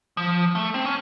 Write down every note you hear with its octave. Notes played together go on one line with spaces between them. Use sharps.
F3
A3
C4
C#4